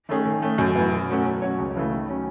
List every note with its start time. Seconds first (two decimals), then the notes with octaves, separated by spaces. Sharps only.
0.09 D#3 A3 C#4 G#4
0.25 D#3
0.42 A3 C#4
0.58 F#2
0.76 E3 B3
0.92 B2
1.09 F#3 A3 C#4 F#4
1.25 F#3
1.42 C#4 F#4 C#5
1.58 C#2
1.76 C#3 E3 A3
1.92 D#3
2.08 F#3 C#4